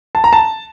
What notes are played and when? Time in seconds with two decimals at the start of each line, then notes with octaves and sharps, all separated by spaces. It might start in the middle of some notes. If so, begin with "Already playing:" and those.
0.15 A5
0.24 A#5
0.33 A5